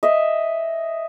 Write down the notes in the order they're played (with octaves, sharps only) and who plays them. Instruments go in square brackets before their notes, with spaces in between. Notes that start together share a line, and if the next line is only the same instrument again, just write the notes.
[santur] D#5 E5